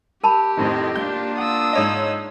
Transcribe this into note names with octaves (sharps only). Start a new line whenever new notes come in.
G4 A#4 A5 B5
F2 A2 D#3 C4 D#5
A#3 D4 F4 G6
F#5 D#6 E6
G#2 C#5 D#5